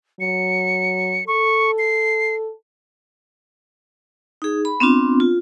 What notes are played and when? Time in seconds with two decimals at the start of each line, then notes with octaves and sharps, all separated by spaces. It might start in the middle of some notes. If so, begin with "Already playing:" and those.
0.20 F#3 C#7
1.27 A4 C#6
1.78 C7
4.42 D#4 G#4
4.65 B5
4.80 B3 C4 D4 F4
5.20 F4